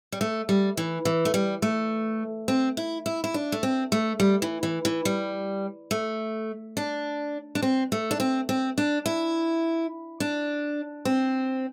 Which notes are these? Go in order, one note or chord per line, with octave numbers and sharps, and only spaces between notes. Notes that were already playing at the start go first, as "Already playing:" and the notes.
G3
A3
G3
E3
E3
A3
G3
A3
C4
E4
E4
E4
D4
A3
C4
A3
G3
E3
E3
E3
G3
A3
D4
D4
C4
A3
D4
C4
C4
D4
E4
D4
C4